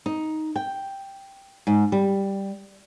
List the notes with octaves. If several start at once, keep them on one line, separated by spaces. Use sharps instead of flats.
D#4
G5
G#2
G3